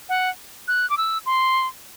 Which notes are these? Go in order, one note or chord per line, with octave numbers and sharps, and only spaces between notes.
F#5
F#6
D6
E6
C6